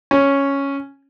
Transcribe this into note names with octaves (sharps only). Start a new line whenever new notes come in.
C#4